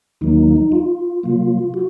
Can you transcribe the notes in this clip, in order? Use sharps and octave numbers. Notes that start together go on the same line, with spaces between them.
D#2 D#3 F#3 A#3 D#4
F4
C3 F#3 A#3
F#4